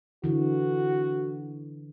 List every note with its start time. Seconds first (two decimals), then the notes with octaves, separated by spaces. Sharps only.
0.24 D3 E3 F#4